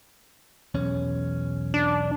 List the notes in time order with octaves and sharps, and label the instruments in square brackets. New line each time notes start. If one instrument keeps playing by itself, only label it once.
[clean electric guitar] B1 E2 C#4
[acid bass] D4